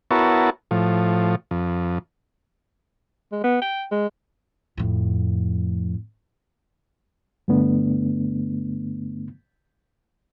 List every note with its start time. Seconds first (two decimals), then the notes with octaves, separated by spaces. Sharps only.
0.11 B3 E4 F#4 A#4 C#5 A5
0.71 A2 F3
1.51 F2
3.32 G#3
3.44 B3
3.61 G5
3.91 G#3
4.77 F2 A2
7.48 G2 D3 A3 B3 D4